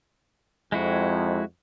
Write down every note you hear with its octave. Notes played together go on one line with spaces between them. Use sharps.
F2 G#3 E4 F#4